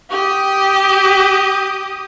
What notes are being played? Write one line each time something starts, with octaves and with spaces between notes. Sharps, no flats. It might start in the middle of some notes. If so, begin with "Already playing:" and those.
G4 D#6